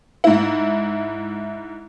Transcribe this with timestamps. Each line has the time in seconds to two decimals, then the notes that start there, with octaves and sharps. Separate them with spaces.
0.24 G#2 E4